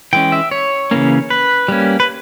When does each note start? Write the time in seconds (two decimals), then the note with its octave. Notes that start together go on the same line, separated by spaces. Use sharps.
0.13 E3 G#3 C#4 G5
0.32 E5
0.51 C#5
0.91 C#3 E3 A#3 C#4
1.30 B4
1.68 G3 A#3 C#4
2.00 B4